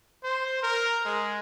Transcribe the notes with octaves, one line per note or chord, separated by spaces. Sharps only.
C5
A#4
G#3